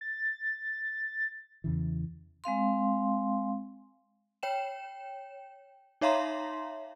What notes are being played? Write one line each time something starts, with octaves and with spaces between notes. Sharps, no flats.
A6
E2 C#3 E3
G#3 C4 F5 C6
C#5 G5 E7
D#4 C#5 E5 F5 A#5 C6